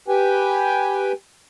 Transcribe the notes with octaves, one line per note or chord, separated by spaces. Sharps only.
G4 B4 G5 G#5